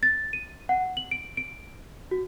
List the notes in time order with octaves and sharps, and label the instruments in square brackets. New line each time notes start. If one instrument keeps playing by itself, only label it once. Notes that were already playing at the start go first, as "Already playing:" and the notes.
[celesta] A6
D#7
F#5
F#7
D7
D7
F#4